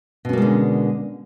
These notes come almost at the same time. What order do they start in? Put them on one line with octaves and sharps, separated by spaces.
B2 C#4 A#3 G#3 D3